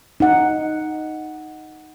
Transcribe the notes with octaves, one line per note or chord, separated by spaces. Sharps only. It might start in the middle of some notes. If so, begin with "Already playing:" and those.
D#4 F#5